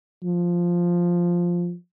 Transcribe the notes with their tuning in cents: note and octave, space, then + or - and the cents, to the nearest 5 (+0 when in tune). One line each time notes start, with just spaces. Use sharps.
F3 +0